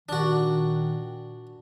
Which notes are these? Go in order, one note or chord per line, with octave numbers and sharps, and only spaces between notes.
A#2 D#3 D4 F#4